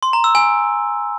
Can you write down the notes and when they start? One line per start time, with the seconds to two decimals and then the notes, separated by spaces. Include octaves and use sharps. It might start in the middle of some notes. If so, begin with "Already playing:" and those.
0.03 C6
0.13 A#5
0.24 E6
0.35 G#5